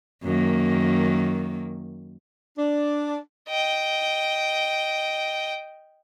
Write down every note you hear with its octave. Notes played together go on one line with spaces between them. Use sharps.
F#2 D#3 A#3
D4
D#5 G5